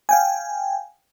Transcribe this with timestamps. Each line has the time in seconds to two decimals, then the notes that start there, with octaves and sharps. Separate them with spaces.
0.09 F5 G5 G#5